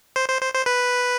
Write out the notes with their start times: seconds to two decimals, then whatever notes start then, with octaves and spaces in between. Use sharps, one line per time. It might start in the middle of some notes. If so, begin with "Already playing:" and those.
0.16 C5
0.29 C5
0.42 C5
0.54 C5
0.66 B4